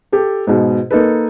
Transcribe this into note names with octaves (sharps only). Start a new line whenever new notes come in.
G4 A4
G#2 B2
A#3 D#4 A4 B4